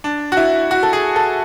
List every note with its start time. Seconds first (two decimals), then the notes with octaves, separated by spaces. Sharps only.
0.04 D4
0.32 F#4
0.37 E4
0.71 F#4
0.83 A4
0.93 G#4
1.16 A4